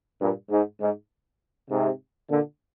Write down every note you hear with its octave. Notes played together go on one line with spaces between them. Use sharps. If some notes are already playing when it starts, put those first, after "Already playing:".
G2 A#2
G#2
G#2
G#2 C3
A#2 D3